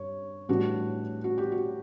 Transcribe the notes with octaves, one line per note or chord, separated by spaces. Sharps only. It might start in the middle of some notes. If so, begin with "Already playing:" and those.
Already playing: G2 C#5
A2 E3 G3 D4 F#4
F#4
G4
F#4